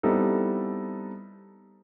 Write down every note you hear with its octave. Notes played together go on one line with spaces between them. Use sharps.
G3 B3 C4 D#4 E4 A4